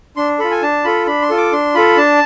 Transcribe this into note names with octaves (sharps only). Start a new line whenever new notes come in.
D4 C6
F4 A4 B5
G#5
D4 A5
F4 A4 B5
D4 B5
C6
F4 A4
D6
D4 C6
F4 A4 B5
D4 A5